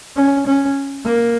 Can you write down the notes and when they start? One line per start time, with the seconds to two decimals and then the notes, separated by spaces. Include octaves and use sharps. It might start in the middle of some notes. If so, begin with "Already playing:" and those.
0.16 C#4
0.47 C#4
1.05 A#3